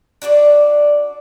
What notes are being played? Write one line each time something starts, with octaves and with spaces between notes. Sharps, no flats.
D4 F#4 A4 D5